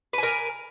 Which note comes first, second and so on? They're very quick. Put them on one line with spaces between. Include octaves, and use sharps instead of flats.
B4 G#5 A#4